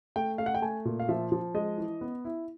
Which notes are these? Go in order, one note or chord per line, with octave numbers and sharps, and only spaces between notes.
A3 G5
A3 F5
F#5
G5
A3 G#5
A#2
F5
F3 E5
F3
G#3 D#5
E3
B3
E4